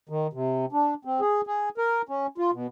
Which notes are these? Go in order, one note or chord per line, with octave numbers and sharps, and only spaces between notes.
D#3
C3
D4
C4
G#4
G#4
A#4
C#4
F4
B2